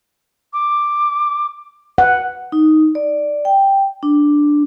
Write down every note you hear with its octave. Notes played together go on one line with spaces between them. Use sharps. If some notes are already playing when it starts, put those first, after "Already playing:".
D6
B4 F#5
D#4
D5
G5
D4